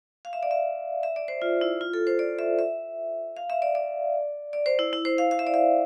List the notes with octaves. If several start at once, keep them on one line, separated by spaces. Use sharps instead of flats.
F5
E5
D5
E5
E5
D5
C5
F4
E4
F4
A4
C5
D5
E5
E5
F5
E5
D5
D5
D5
C5
E4
E4
C5
F5
F5
E5
D5
E5